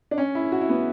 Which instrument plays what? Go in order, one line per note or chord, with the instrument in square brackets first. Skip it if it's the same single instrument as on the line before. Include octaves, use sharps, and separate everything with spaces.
[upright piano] D4
C#4
E4
F#4
E4
B3